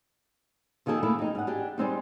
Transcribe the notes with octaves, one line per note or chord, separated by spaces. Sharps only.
F2 D#3 A#3 G#4 A4
A3 A#3 E4 G#4 A4
F2 D#4
G#2 F#5
D4 G4 G#4
G3 G#3 C4 D#4